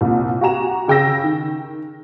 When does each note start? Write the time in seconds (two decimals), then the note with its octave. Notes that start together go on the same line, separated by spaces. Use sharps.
0.01 C2 A#2
0.41 F#4 G4 G#5 A#5 E7
0.88 C#3 G5 E6 A#6
1.24 D#3